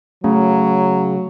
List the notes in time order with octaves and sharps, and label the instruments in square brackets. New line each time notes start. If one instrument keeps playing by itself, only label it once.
[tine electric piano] C#3 [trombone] F#3 [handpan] A3